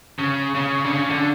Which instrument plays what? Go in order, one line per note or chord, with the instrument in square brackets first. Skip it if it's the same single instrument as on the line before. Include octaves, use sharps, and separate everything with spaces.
[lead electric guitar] C#3
C#3
D3
C#3
D3